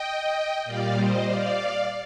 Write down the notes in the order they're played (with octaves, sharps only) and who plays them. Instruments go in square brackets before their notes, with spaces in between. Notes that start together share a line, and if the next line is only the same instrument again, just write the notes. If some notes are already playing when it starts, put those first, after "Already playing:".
Already playing: [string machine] D#5 G5
A#2 G3 D5 F5
C5 D#5
D5 F5